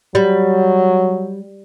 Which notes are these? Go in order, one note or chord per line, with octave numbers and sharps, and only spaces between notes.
F#3 G3